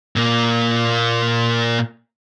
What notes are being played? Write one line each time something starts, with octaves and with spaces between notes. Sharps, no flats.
A#2 A#3